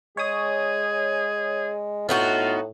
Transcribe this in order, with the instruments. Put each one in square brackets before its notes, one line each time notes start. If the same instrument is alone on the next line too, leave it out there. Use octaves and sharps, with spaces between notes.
[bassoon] G#3 [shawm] G#4 [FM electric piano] C#5 D#6
[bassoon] A2 [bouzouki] B3 D#4 F#4 [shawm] F4